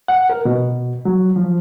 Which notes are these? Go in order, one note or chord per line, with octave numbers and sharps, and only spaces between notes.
F#5
A#4
B2
F#3
F3